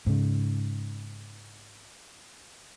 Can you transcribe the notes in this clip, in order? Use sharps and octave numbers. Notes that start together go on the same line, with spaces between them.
G#2 C#3